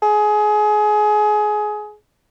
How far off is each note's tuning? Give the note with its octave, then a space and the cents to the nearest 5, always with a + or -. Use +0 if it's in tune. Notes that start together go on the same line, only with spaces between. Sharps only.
G#4 +25